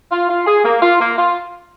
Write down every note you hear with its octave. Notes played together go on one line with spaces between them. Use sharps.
F4
F4
G#4
A#3
F4
A#3
F4